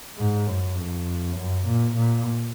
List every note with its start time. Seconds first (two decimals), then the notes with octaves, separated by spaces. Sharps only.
0.18 G#2
0.47 F#2
0.77 F2
1.36 F#2
1.67 A#2
1.96 A#2